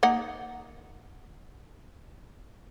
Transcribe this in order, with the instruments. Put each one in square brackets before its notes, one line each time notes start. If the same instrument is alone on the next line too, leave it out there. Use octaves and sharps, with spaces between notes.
[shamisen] A#3 D#4 F#5